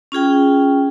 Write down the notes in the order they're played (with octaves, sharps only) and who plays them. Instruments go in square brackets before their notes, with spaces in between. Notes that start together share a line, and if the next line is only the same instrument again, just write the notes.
[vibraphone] C#4 F4 G#4 G5